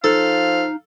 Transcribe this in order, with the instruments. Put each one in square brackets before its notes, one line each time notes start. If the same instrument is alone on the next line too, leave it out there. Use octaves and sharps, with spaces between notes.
[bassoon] F3 [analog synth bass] D#4 [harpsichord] A4 [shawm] F5